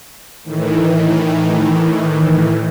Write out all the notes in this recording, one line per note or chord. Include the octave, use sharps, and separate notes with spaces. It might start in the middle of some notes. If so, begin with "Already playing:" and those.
A2 D#3 E3